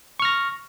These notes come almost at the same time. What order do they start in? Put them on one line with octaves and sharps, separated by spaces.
C#6 F6 A#6